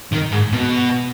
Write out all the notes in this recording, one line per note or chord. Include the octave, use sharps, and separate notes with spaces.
D#3
G#2
B2